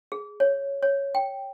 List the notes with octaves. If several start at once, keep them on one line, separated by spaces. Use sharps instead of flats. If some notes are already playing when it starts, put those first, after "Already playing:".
G#4
C#5
C#5
G5